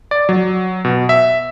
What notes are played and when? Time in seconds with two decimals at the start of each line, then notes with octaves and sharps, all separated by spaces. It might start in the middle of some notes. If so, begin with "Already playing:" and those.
0.11 D5
0.29 F#3
0.85 B2
1.09 E5